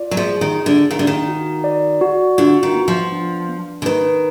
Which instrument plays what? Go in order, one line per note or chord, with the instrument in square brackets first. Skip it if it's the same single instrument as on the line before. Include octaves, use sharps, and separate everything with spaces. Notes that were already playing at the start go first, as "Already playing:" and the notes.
Already playing: [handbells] F4 D5
[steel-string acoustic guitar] F#3
[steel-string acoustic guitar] F3 [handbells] G#4
[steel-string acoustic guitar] D#3
[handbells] F4
[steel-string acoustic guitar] D3
[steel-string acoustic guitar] D#3 [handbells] F5
[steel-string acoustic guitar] D3
D#3
[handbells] F#4
D5
F#4
[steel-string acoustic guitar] D3 [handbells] F4
[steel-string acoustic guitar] D#3
[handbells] B3
[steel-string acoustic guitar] F3
[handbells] D4
B3
[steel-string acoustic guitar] D3
[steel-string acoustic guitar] D#3 [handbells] B4